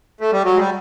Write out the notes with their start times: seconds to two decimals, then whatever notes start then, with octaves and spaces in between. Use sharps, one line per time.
0.21 A3
0.32 G3
0.44 F#3
0.55 G#3
0.59 G3